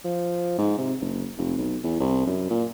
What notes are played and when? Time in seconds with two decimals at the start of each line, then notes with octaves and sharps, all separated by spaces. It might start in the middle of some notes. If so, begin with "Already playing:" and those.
0.05 F3
0.58 G#2
0.78 C3
1.01 F#1
1.37 F1
1.57 B1
1.83 E2
2.00 C2
2.26 F#2
2.50 A#2